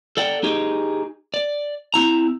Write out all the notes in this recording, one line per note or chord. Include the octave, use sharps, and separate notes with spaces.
A4 D5 F#5 G5
D#4 G4 G#4 D#5
D5
C4 E4 A#5